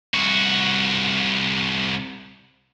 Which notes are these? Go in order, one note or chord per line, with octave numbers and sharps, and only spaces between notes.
C2 F#4